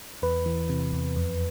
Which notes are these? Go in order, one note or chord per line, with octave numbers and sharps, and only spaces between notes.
E2 B4
E3
C3
E2
F2